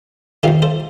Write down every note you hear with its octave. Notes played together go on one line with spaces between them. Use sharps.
F2 C3 D#3 F4 A4
A4 C5